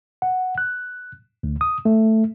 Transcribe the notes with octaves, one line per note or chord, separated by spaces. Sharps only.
F#5
F#6
D2
D#6
A3